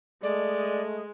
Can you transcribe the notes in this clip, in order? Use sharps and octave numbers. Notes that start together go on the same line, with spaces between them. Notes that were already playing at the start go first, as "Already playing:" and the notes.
G#3 A3 D5 D#5